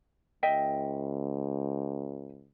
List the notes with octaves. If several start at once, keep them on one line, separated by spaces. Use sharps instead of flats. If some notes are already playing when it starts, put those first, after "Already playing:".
C#2 D#5 E5 G5